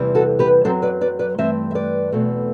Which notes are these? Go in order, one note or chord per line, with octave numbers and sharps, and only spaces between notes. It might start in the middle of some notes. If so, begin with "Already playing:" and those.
Already playing: E2 C3 E3 G3 C4
F#4 A4
G4 B4
F#2 F#3 C4 A4 C5
B4 D5
B4 D5
B4 D5
G2 E3 A3 C4 C5 E5
E5
B4 D5
E2 B2 A3 C4